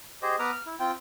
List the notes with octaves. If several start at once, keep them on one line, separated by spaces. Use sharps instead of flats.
G4 G#4 C5 D#5
B3 B4 A#5 D6 D#6 F6
F6
E4
C4 F4 G5